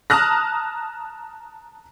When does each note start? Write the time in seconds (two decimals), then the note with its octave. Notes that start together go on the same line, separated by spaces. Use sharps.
0.10 A5 A#5 D#6 F6 F#6 A#6